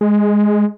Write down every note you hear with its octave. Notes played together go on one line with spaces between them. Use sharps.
G#3